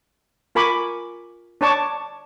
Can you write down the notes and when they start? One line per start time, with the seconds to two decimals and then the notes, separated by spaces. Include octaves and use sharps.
0.55 F4 A#4 G#5 B5 C#6 D6
1.61 D4 C#5 A5 C#6 D6